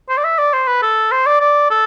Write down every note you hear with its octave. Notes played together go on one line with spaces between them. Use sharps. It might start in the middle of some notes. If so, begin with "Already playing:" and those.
C5
D5
E5
D5
C5
B4
A4
C5
D5
D5
A4